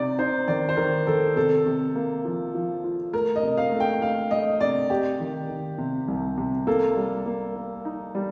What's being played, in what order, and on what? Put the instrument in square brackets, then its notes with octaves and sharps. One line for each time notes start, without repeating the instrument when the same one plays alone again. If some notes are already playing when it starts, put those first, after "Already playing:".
Already playing: [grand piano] C3 D#4 [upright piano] D5
[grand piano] D#4 [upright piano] C5
[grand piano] D#3 [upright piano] D5
[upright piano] C5
[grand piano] D#3 [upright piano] A#4
[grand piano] D#3 [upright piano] A4
[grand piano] C3 [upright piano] A4
[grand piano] C3
A#3
F3
F3
F4
[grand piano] A3 [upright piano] A#4
[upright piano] D#5
[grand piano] C3
[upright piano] F5
[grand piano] A3
[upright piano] G5
[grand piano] A3 [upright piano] F5
[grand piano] A3 [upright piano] D#5
[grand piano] C3 [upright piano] D5
[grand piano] C3 [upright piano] G4
[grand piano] D#3
D#3
C3
C2
C3
[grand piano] A#3 [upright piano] A4
[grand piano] G3
A#3
A#3
D#4
G3